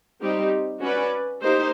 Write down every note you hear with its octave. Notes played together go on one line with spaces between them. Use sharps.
G3 C4 D#4 G4
C#4 F#4 B4 D5
A#3 D#4 G4 C5